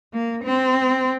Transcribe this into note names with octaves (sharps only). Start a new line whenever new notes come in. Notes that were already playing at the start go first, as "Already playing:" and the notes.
A#3
C4